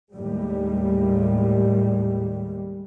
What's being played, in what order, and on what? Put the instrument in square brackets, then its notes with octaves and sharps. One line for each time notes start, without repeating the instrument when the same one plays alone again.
[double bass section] D#2 A2 G3 G#3